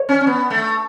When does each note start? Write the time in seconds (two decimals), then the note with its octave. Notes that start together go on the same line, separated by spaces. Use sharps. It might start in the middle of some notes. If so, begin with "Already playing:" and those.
Already playing: C#5
0.09 C#4
0.21 C#4
0.27 B3
0.50 A3